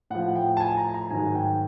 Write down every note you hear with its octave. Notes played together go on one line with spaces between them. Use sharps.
A2 F3 F#5
G5
A5
G#5
A#5
A#5
G#2 D#3 F#3 G#5
G5